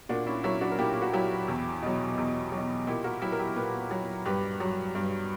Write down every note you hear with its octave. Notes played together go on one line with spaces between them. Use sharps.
A#2 D4 F#4
C#4 E4
F#3 C#4 E4
D4 F#4
A#4
A#2 E4 G4
F#4
F#3 E4 G4
E2
B2 F#3
E2
B2 F#3
A#2 E4 G4
F#4 A#4
F#3 E4 G4
A#4
E4 G4
A#2 G4 B4
F#3
G2 G4 B4
F#3
G2